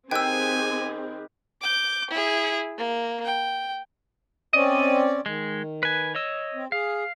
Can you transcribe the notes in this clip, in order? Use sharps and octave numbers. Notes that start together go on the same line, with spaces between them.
D#3 C4 G4 G#4 B4 G5 G#5 E6
D6 G6
E4 G#4
A#3
G5
C4 C#4 D5 D#5
D#3 G#3
B4 G#5
C#5 D#5 E6
C4
G#4 F5